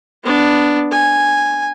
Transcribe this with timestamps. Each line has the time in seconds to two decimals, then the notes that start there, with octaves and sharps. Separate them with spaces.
0.24 B3 D4
0.92 G#5